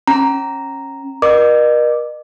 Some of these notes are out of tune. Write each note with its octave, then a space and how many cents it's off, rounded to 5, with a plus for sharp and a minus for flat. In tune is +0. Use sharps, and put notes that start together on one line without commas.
C#4 -20 A#5 +0
A#4 +40 D#5 -40 D6 +0